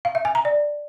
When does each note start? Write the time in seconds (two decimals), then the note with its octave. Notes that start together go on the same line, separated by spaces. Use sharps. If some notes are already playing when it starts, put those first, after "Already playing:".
0.05 F5
0.15 E5
0.25 G#5
0.35 A#5
0.45 D5